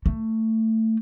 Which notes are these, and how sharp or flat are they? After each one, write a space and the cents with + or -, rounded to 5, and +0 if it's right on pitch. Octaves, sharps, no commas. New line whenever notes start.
A3 +20